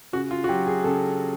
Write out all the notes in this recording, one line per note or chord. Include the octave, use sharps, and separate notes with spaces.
C#3 F#4
F4
F#4
F#3 G4
G#4
C#3 A4